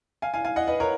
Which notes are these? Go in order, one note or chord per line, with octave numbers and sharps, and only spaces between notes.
F5 G#5
F5 G#5
F5 G#5
D#5 F#5
B4 D#5
A#4 C#5